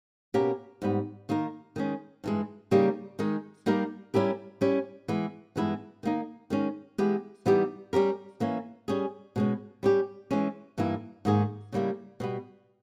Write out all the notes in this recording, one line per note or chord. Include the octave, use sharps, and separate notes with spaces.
B2 A#3 C#4 G4 A#4
G#2 G3 B3
D#3 A#3 D#4 A#4
D#3 G#3 C#4
G2 E3 G#3
C#3 G3 A#3 D#4 G4
D#3 G#3 D#4
G3 A#3 D#4 G4 A#4
G3 C#4 E4 G4 A#4
G3 C#4 E4 G4
E3 G#3 B3
G2 E3 G#3 B3 E4
D#3 A#3 D#4
D#3 G#3 C#4
E3 G#3 B3 G4
E3 G3 B3 D#4 G4
G3 C#4 G4 A#4
E3 A#3 C#4
G3 C#4 G#4
B2 G#3 C#4
G3 C#4 G4
E3 G#3 C#4
G2 E3 A#3 E4
G#2 D#3 A#3 D#4 G#4
C#3 G3 A#3 E4
B2 G3 B3